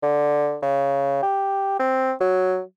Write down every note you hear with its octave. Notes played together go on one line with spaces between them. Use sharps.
D3
C#3
G4
C4
F#3